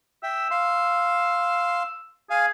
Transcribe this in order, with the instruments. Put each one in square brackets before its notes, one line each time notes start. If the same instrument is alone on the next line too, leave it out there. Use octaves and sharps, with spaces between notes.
[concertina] E5 G5 [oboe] E6
[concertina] F5 C6
[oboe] G#4 [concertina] F5 G#5